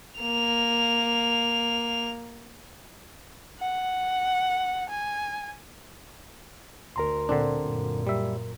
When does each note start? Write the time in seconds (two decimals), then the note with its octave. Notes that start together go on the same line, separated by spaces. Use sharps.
0.19 A#3 F7
3.60 F#5
4.89 G#5
6.96 D2 A#4 A#5 C6
7.29 A#2 D3 C4 D4
7.60 F#2 A#2
8.07 G3 E5